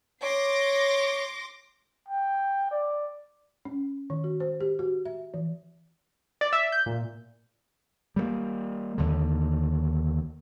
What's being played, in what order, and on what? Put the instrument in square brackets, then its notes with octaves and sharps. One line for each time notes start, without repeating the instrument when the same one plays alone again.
[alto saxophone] C#5 [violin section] C6 D6 A#6
[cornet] G5
D5
[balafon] C#4
D#3
F#4
C5
G4
F#4
E5
E3
[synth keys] D5
E5
G6
A#2
[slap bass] G3 G#3 A#3
D#2 D3